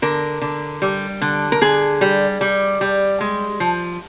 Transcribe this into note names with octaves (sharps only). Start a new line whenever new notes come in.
D3 A#4
D3
G3
D3
A#4
D3 G#4
G3
G3
G3
G#3
F3